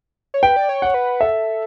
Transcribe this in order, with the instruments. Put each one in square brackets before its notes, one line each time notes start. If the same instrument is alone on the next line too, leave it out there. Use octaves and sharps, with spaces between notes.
[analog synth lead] C#5
[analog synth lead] B4 [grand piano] G5
[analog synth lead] D5
C#5
[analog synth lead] C#5 [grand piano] F#5
[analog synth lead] B4
[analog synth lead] A4 [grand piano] E5